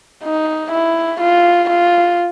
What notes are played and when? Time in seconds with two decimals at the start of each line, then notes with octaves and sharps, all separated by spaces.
0.23 D#4
0.72 E4
1.20 F4
1.69 F4